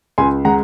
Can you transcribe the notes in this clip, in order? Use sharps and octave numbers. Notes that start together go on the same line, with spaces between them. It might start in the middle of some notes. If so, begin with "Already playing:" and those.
C#2 G#5 C6
G#3 F#5 A#5